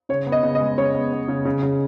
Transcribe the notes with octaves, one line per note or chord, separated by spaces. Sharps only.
C#3 C#5
B3
D#5
C#3
D#5
G#3
C#3 C#5
B3
B3
C#3
C#3
C#3